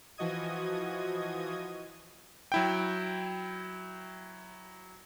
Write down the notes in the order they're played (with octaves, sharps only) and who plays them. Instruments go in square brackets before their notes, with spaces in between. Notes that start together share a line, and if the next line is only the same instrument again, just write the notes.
[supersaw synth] E3 F3 F#4 D#5 D#6 G#6
[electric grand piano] F#3 E4 G5